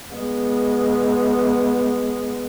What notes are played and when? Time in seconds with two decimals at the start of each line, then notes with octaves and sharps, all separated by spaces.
0.13 G#3 B3